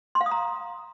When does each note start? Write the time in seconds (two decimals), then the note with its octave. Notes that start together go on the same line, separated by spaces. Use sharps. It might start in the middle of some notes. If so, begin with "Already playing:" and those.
0.15 C6
0.21 F5
0.26 D#6
0.31 A#5